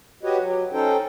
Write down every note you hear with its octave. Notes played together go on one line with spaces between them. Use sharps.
F#4 G4 B4 C#5 D#5
F#3
C#4 D#4 A4 C5 G5